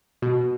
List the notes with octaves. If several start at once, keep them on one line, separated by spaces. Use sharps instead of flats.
B2